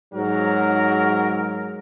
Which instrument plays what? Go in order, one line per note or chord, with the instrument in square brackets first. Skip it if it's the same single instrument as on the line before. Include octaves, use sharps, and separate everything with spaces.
[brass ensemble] G#2 F#3 A#4